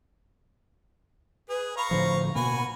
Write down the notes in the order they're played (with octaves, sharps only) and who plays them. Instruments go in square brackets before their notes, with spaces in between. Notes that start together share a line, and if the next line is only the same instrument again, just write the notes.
[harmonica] G#4 [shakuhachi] B4
[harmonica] F5 A#5 C#6 [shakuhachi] B5
[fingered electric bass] A2 D3 F3 [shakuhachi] C5
[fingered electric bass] B2 A#3 [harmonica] F#4 G#5 [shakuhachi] B5